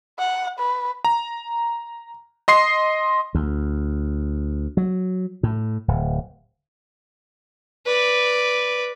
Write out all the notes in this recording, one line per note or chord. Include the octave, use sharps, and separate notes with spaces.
F#5
B4
A#5
D#5 C6 C7
D2
F#3
A2
D1
B4 D5